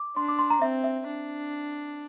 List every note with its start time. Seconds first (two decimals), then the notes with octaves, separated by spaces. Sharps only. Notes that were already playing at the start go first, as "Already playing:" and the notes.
Already playing: D6
0.16 D4 C6
0.28 D6
0.39 C6
0.50 A#5
0.61 C4 E5
0.84 E5
1.07 D4